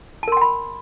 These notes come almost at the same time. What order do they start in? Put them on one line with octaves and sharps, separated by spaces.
A5 A#4 C6 G5 B5